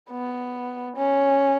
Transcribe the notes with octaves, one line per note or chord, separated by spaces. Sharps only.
B3
C#4